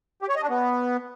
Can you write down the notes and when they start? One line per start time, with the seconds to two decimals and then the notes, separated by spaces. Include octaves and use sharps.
0.22 G4
0.29 C#5
0.36 D#5
0.43 D4
0.50 B3